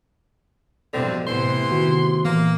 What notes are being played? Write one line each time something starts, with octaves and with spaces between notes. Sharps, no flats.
E2 G2 B2 D3 F3 C4
A2 C3 E3 B3 C5 C6
D#3 F#4
A#2 E3 A#3